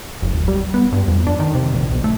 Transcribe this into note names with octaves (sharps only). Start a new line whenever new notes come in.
F#1
D#1
G3
B3
G2
F2
D4
D#3
C3
A#1
B1
A3